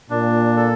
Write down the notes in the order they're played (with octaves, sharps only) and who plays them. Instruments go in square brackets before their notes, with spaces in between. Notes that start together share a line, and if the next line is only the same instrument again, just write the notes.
[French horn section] A#2 [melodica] D4
[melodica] A4